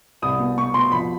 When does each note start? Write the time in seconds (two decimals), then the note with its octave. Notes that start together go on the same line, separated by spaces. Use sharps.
0.22 C2 D#6
0.40 B2
0.57 B2 C#6
0.74 B2 C6
0.92 F2 B5